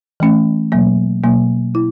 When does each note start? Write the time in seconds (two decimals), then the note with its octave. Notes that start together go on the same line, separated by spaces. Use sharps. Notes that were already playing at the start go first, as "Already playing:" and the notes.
0.20 E3 A3 C#4
0.72 B2 F#3 A#3
1.24 B2 F#3 A#3
1.75 E4